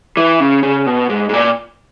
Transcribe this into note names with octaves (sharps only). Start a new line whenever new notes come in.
E3
C#3
C#3
B2
G#2
G#2
A#2